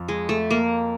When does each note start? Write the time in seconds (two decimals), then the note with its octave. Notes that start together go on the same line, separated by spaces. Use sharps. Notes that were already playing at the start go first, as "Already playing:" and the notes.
Already playing: F2
0.08 G#3
0.29 A3
0.50 A#3